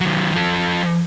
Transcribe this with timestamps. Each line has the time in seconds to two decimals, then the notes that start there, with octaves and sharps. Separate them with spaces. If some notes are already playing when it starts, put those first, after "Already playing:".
0.01 D#3 F#3
0.33 F3 A4